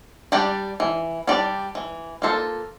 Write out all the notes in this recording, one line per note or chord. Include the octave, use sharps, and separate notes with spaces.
G3 D4 G4 D5
E3
G3 D4 G4 D5
E3
A#3 F4 A4 C5